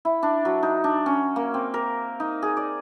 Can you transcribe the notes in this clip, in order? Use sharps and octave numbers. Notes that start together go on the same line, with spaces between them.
E4
D4
F#3
D#4
D4
C#4
A#3
C4
A#4
D#4
G#4
D5